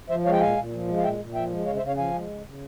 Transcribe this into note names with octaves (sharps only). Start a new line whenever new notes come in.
F3 C5 E5
G#3 C#5 F5
G5
A#2 F5 G#5
A#2
F3
G#3
F5
A#2 E5 G5
A#2
F3 E5 G5
G#3
C#3 C#5 F5
C5 E5
C#3
C#5 F5
F3 F5 G#5
G#3
C#3
C#3